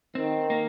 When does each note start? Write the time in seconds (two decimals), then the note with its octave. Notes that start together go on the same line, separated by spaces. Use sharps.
0.15 D#3 C4
0.50 A#3